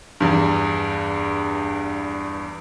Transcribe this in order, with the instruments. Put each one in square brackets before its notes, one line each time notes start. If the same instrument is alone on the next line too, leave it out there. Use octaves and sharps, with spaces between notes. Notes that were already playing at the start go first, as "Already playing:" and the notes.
[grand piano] E2 G2